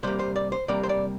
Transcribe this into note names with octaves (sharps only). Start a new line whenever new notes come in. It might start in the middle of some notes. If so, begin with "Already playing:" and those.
C3 G3 A#3 C5
C5
D5
C5
C3 G3 A#3 D5
C5
D5